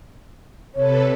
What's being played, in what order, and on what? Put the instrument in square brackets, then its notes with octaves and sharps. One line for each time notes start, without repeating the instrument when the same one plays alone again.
[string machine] C3 A4 B4 [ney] C#5